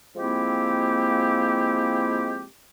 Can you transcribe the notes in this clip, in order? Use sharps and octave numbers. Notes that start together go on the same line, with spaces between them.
F3 G#3 A#3 C4 E4 G4